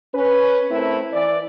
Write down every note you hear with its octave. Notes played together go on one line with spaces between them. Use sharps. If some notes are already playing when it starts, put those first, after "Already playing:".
C#4 B4
A3 C4 E4 A#4
E3 D5